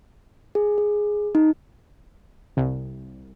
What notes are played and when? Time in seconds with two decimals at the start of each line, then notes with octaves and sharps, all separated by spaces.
0.55 G#4
0.78 G#4
1.35 D#4
2.57 C2